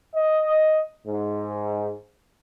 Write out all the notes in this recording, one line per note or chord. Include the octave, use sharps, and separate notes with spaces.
D#5
G#2